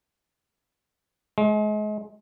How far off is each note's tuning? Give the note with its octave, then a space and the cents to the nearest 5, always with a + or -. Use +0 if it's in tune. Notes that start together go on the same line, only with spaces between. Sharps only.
G#3 +35